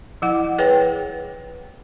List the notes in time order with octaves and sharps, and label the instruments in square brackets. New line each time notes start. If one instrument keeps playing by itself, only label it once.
[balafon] F3 E4 F#5
G#4 B4 C#5 F#5 G5